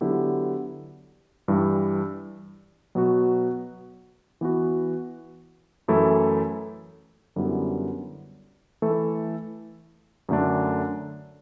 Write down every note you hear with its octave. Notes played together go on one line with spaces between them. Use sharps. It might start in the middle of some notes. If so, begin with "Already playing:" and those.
D3 F#3 B3 E4 G4
G2 E3 G3
B2 F#3 B3 F#4
E3 B3 F#4
F#2 E3 A3 E4 A4
F#2 D3 G3 B3 E4
E3 A3 E4 A4
F#2 D3 A3 D4